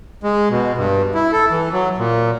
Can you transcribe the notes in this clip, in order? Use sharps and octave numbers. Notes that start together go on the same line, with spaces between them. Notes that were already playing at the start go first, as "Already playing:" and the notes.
G#3
B2
G2
E4
A4
E3
F#3
A#2